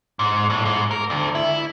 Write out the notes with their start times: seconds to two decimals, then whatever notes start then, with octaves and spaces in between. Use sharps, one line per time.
0.19 G#2
0.50 A2
0.65 G#2
0.91 A#4
1.10 D2
1.35 E4